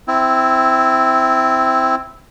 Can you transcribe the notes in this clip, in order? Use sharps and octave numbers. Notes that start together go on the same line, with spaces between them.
C4 E4